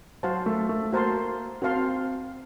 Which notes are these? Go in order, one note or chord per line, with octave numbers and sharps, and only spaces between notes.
F#3 F#4 C5 F5 A5 C6
A3
A3
A#3 F#4 C5 F5 A5 C6
C4 F#4 C5 F5 A5 C6